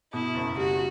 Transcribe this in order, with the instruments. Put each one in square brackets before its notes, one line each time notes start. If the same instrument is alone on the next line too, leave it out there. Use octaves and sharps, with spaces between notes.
[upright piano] B2 [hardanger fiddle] E4
[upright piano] F#1
[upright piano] G3 [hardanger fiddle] F#4